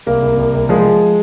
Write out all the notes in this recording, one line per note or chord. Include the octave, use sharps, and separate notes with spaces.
C2 A#3
C2
C2
C2
F3 G#3
F3